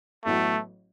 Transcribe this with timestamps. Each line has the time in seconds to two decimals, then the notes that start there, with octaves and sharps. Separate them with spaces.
0.25 A1 A2 F#3 A3 B3 F#4